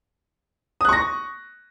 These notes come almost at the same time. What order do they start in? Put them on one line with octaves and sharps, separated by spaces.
D#6 F#6 C#6 A#6